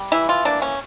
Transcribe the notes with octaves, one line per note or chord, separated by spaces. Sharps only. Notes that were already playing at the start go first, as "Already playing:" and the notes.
Already playing: G3
E3 E4
F4
A#3 D4
C#4